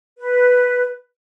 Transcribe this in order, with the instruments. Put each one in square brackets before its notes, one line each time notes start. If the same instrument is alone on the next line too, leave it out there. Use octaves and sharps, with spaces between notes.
[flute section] B4